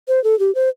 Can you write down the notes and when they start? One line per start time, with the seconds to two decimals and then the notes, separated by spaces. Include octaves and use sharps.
0.08 C5
0.24 A4
0.39 G4
0.55 C5